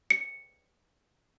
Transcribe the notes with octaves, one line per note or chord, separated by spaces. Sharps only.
C#7